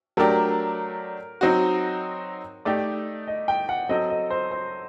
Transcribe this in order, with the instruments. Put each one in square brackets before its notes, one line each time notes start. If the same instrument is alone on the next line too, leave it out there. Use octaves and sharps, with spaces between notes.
[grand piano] F#3 A3 D4 G4 [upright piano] A#4
[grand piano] F#3 C4 D#4 F#4
[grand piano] A3 D#4 G4 [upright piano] D5
[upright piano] D#5
G5
F#5
[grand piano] F#3 C4 F#4 A4 [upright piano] D#5
[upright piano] D#5
C5
C5